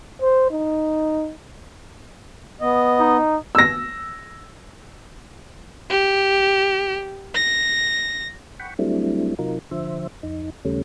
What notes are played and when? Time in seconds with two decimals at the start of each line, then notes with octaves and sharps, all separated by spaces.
0.22 C5
0.51 D#4
2.61 B3 D#5
3.00 D#4
3.55 E6 A#6
5.90 G4
7.35 A#6
8.60 F#5 G5 B5 C#6
8.79 F#3 G3 A3 C4 D4 E4
9.39 C3 F#3 D#4 F4 A#4
9.71 D3 F3 C5 E5
10.23 F2 D#4
10.65 D#2 C#3 G3 A3 C#4